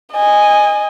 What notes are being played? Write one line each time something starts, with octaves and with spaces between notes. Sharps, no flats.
D#5 G#5